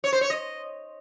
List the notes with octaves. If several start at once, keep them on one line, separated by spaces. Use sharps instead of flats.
C#5
C5
C#5
D#5